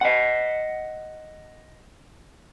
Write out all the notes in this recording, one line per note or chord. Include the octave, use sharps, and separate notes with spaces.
D#5 F#5